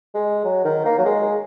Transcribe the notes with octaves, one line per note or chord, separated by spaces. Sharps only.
G#3
F#3
D#3
A#3
F#3
G#3